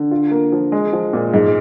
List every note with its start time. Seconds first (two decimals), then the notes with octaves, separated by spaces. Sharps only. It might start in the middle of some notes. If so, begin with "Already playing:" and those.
Already playing: D3
0.11 F4
0.31 A#3
0.52 F3
0.72 G#3
0.93 F3
1.13 A#2
1.34 G#2